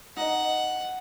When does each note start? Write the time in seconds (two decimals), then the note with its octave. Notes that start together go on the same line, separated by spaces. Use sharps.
0.17 D#4 D#5 F#5